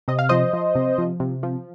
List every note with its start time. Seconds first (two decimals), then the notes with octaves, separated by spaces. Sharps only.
0.08 C3 D#5
0.19 F5
0.29 F3 C5 D#5
0.53 F3
0.75 C3
0.98 F3
1.20 C3
1.43 F3